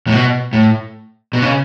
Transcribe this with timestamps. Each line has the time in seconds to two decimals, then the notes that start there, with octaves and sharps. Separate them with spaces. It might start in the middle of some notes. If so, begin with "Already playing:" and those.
0.07 A2
0.12 B2
0.53 A2
1.33 B2
1.42 C#3